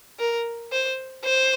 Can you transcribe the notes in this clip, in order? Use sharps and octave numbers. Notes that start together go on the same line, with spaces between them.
A#4
C5
C5